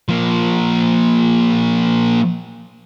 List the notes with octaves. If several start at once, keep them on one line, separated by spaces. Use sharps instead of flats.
F3 A#3